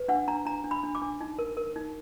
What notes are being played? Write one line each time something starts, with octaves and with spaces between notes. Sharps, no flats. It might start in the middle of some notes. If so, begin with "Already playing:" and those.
Already playing: B4
D4 F#5
D4 A#5
D4 A#5
D4
B5
D4
D6
D4
D#4
A#4
A#4
D#4